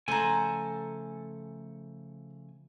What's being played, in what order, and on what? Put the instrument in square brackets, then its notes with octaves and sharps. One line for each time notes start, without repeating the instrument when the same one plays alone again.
[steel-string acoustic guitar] C#3 F3 A3 [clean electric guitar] A4 G#5 [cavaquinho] C5 A#5